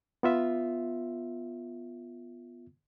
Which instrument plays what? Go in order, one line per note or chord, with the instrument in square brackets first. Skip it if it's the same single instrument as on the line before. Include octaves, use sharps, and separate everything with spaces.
[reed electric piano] B3 F4 E5